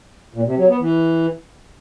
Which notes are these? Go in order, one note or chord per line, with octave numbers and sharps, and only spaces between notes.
A#2
C3
F#3
B3
E3